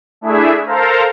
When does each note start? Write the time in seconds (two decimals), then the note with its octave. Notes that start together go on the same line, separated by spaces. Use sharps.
0.21 A3 D4 E4 G#4 E5
0.66 A4 A#4 C5 F5 A#5